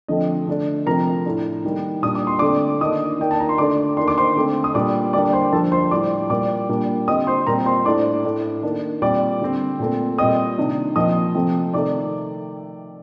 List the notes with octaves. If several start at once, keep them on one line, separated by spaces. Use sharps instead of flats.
D3 F3 A3 C4 D#5
D3 A3 D4
C3 F3 A3 C4 A#4 A#5
A2 A3 D4
D#3 G3 A#3
A#2 G3 D4 D#6
D6
C6
D3 A3 C4 D5 D6
D#3 A#3 D4 D#5 D#6
D#3 A#3 D4 G5
A5
A#5
C6
D3 A3 D4 D5 D6
D#3 A#3 D4 C6
D6
C5 C6
D3 A3 C4
D#6
A#2 G3 D4 D5 D6
D3 G3 A#3 D4 D5 D6
C5 C6
D3 F3 A#3 D4 A4 A5
C5 C6
A2 G3 D4 D5 D6
A#2 G3 A#3 D5 D6
A#2 G3 A#3 D4
D3 G3 C4 D#5 D#6
C5 C6
A#2 G3 C4 A#4 A#5
C5 C6
A2 A3 D4 D5 D6
A2 A3 D4
D#3 A#3 D4
A#2 G3 C4 D5 D6
D3 G3 C4
A#2 A3 C4
A#2 G3 C4 D#5 D#6
C3 D#3 A#3 D4
A#2 F3 C4 D#5 D#6
C3 F3 A3 C4
C3 D#3 A3 D5 D6